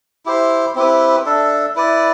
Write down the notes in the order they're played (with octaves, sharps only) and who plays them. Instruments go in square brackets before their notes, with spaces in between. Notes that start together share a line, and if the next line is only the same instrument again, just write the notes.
[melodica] E4 G4 C5
C4 E4 G4 B4
D4 A4 E5
E4 B4 D5